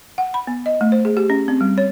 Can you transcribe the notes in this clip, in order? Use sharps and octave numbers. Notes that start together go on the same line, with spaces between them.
F#5
B5
B3
D#5
A3
C5
G#4
G4
C#4
C4
G3
C#5